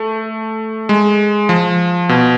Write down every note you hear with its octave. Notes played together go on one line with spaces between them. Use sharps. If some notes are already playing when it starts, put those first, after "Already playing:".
Already playing: A3
G#3
F3
B2